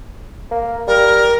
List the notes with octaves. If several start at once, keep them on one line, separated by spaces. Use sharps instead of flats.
A#3
G3 A#4